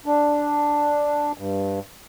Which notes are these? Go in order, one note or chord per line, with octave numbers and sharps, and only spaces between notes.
D4
G2